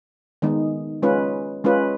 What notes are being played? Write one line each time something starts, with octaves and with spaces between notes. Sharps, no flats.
D#3 G#3 B3 D#4
G#3 C#4 F4 B4
G#3 C#4 F4 B4